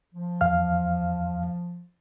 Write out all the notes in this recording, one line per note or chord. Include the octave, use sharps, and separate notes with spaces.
F3
E2 F5 F6